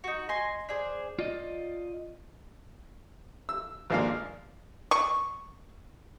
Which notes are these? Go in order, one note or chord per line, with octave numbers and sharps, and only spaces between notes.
D#4 F#4
D#5 G#5 C6
D4 G#4 C5
F4 D5 D#5
E6
G#1 F3 G#3 A#3 D4 F5
C#6